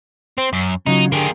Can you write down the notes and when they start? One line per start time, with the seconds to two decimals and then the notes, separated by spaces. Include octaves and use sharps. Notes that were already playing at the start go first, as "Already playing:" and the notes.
0.38 C4
0.53 F#2
0.86 C#3 F#3 D#4 F4
1.12 D3 A#3 G4 G#4